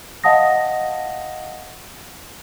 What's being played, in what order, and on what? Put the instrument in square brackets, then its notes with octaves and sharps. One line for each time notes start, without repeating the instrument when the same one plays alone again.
[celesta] D#5 F5 F#5 A5 D#6 A#6